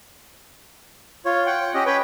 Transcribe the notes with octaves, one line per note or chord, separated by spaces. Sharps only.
F4 C#5
F#5 G5
C#4 G4 D#5
B4 C#5 G5